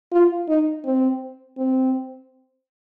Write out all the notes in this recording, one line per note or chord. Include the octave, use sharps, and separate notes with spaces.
F4
D#4
C4
C4